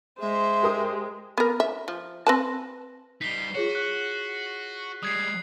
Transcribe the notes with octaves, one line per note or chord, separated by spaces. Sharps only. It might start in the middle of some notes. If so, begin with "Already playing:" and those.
G#3 C5 E5
G4 A#4 D#6
B3 A#4
E5
F3
C4 B4 A5
G3 D#4 B6 C7 G7
F4 F#4 G#4 C#5
F#6 B6 D#7
G3 G#3 D#6 G#6 C7